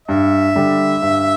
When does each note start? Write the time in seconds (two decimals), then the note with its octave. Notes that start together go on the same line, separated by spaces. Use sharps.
0.08 G2 E5
0.55 D3 G3
1.02 G2